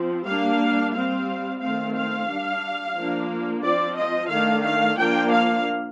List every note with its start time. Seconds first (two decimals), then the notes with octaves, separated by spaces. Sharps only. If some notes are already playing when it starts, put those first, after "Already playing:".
Already playing: F3 C4
0.26 G3 A#3 D4 F5
0.93 G3 C4 F5
1.60 D#3 A3 C4 F5
1.94 F5
2.29 G3 D4
2.95 F3 A#3 D4
3.63 F3 C4 D5
3.96 D#5
4.30 D#3 A3 D4 F5
4.63 F5
4.97 F3 A#3 D4 G5
5.32 F5